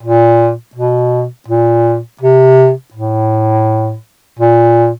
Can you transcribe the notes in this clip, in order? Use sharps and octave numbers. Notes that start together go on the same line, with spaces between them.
A#2
B2
A#2
C3
A2
A#2